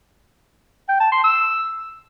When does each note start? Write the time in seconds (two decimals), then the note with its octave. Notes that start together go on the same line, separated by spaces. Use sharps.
0.88 G5
1.00 A5
1.12 C6
1.24 E6